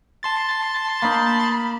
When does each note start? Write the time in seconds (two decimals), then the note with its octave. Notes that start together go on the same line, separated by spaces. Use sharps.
0.23 A5 C6 A6
1.02 A#3 D#4 B5